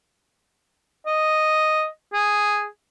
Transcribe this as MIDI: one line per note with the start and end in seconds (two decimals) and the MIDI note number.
1.07 1.87 75
2.13 2.66 68